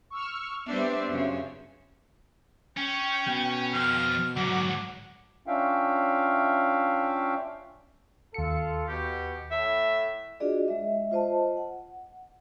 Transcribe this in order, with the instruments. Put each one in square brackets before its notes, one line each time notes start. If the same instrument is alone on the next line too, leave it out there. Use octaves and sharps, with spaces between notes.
[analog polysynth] C#6 E6 F6
[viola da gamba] G3 C4 D4 [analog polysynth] B3 E5 C6
[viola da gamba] F#2 C#3
[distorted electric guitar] C#4 [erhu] G5
[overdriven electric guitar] B2
[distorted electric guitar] F2 [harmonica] F6
[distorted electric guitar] D2 G#2 [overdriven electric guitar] F#3 [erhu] F#5 [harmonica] D6
[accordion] C#4 D4 F4 E5 F5 G5
[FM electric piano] D#2 C#7 [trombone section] F4 A4
[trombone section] B2 [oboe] G4
[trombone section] A2 [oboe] E5
[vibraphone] D4 F4 F#4 G#4 D5 D#5
G#3 D#5 E5
F4 C5 D#5 A5
F#5